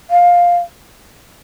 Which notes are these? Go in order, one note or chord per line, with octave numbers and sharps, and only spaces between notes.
F5